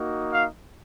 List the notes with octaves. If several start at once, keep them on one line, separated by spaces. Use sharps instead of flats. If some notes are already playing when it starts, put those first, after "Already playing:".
Already playing: A#3 D#4 F#4
F5